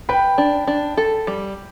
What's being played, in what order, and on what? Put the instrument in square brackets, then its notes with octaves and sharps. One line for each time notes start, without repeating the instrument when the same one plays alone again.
[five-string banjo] B4 [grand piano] G5 B5
[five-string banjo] D4
D4
A4
G3